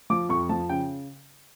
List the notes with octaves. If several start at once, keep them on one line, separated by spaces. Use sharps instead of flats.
F3 D6
F2 C#6
F3 A5
C#3 G5